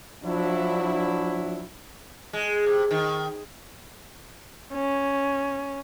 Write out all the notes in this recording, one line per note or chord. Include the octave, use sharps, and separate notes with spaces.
F3 F#3 D4 E4
G#3
C3
D#3
C#4